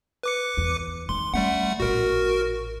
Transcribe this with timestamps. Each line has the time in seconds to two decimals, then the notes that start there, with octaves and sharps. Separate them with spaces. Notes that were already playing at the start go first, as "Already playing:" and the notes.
0.23 B4 D6 C#7
0.57 E2
1.09 D#3 A3 C6
1.34 G3 A3 C#4 F#5
1.80 A1 A#2 F#4 A#4